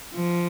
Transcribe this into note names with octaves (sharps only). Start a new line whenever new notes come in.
F3